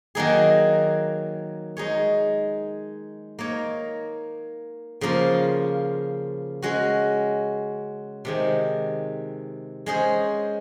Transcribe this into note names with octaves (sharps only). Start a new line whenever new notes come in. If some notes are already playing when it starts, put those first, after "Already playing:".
D#3 F#3 A#3 D#4 G#4
G#3 D#4 G#4 C#5
A#3 D#4 A#4 C#5
C#3 F3 A#3 F4
G#3 C#4 F#4
C3 D#3 G#3
G#3 C#4 G#4 C5